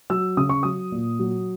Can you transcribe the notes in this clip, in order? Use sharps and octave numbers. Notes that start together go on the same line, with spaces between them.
F#3 E6
C#3 D#6
C#6
F#3 D#6
A#2
F#3